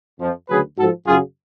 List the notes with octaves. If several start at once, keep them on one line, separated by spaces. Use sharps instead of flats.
F2 F3
D2 C#3 F#3 G#4 B4
G#2 F3 F#4 A4
F#2 C#3 F#3 F4 G#4